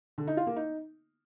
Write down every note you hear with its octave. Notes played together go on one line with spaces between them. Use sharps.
D3
D#4
F4
A#3
D#4